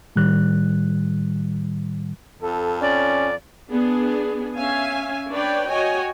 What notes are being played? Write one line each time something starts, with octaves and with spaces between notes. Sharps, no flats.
A2 D#3 G3 F#6
F2 A4
C#4 D5
B3 D4 G#4
C#4 E5 F5 G#5
D4 B4 C#5 D5 G5
F#4 C#5 D#5 G5 G#5